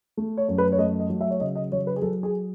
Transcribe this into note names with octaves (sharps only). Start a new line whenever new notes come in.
A3
C#5
F#2
B4
C#5
A3 D#5
D#5
F#3
E5
C#5
C#3 D#5
D#5
F#3 C#5
B4
G#4
F#3 A4
G#4